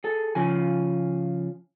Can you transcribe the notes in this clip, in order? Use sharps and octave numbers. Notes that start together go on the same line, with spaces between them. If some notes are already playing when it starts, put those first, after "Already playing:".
G#4 A4
C#3 F3 G#5